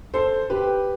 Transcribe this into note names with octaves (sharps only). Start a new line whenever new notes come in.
A4 C5
G4 B4